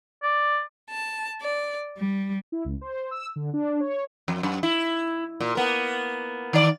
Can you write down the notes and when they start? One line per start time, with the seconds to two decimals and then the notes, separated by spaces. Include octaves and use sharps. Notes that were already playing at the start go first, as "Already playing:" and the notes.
0.23 D5
0.90 A5
1.42 D5
1.97 G3
2.52 E4
2.65 C#2
2.81 C5
3.11 E6
3.36 D3
3.53 D4
3.80 C#5
4.28 F2
4.43 F#2
4.63 E4
5.40 A#2
5.55 A#3 B3 A#4
6.53 D#3 D5